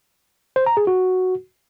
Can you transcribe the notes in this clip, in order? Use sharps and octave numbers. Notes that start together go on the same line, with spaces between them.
C5
A#5
G#4
F#4